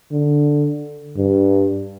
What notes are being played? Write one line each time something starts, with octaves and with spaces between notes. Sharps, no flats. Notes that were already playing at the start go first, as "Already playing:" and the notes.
D3
G2